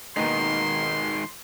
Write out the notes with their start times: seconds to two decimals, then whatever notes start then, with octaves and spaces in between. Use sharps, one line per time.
0.17 D#2 G#2 B2 D#3 D#4 C6